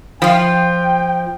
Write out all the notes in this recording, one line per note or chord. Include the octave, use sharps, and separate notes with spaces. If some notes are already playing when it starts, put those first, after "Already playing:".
F3 F4 G5